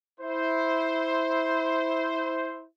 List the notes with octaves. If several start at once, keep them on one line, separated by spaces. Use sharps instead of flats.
E4 C5